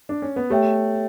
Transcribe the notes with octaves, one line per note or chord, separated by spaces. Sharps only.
D4
C#4
B3
A3 G4 C#5 E5 G5